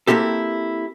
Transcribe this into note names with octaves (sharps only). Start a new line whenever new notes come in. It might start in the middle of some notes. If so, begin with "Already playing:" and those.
A#3 C4 E4 G4 A4